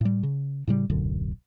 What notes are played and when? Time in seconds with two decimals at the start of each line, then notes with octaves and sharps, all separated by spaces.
0.01 A2 G3
0.23 C#3
0.67 A2 C#3 G3
0.90 D1 B1 F#2 D3